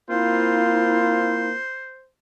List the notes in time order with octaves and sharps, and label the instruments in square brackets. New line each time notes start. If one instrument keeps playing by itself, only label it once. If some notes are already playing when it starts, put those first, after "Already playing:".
[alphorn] A#3 [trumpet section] C4 F4 [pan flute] E4 [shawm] C5